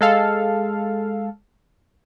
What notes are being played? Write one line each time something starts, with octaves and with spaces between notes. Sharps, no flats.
G#3 A4 F5